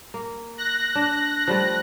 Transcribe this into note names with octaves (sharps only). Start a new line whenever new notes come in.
A#3
F#6 A#6
D4
F3 G3 A3